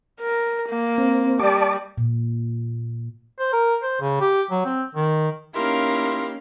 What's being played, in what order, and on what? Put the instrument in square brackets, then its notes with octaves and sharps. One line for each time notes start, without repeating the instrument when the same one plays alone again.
[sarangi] A#4
A#3
[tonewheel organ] C4
[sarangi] G3 [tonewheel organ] D5 A5 D6
[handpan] A#2
[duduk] C5
A#4
C5
C#3
G4
F#3
C4
D#3
[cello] A#3 C#4 [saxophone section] D#4 E4 G4 [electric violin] A#4 F5 [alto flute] C6